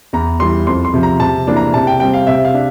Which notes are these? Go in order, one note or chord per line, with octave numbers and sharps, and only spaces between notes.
E2 A#5
E3 G3 C6
F2 C6
C6
C3 F3
A#5
C3 A5
E3 A#3 D4
A#5
C3 A5
G5
G3 C4 G5
F5
C3 E5
F5
D4